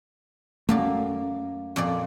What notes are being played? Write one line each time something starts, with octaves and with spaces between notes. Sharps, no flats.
F#2 A3 A#3 D5
F2 A#2 D5